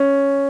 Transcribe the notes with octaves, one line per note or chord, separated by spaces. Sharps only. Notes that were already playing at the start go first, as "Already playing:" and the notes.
Already playing: C#4